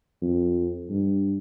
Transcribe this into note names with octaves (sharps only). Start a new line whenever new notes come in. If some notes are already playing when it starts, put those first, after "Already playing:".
F2
G2